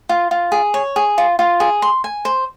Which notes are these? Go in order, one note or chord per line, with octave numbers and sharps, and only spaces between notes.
F4
F4
G#4
C#5
G#4
F4
F4
G#4
C6
G#5
C5